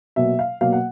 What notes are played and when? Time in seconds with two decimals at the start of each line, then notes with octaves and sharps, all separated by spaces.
0.16 B2 F#3 A#3 E5
0.39 F5
0.61 B2 F#3 A#3 F5
0.73 F#5